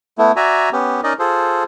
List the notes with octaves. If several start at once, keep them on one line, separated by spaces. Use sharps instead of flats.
A3 B3 E4
F#4 D5 E5 G#5 A#5
B3 C#4 G4
C#4 D#4 A#4 D5 D#5
F4 G#4 A4 C5